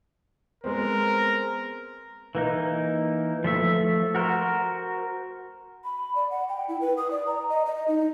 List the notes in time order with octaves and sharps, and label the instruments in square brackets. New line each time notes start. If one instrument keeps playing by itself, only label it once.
[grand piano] G#3 B3 C4 [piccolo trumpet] A#4
[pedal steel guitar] E3 A#3 D#4
F3 A3 E5
F#4 A#4 C5
[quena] B5
D5
F#5
G5
E4
B4
D#6
D5
A#5
D#5
D#5
D#4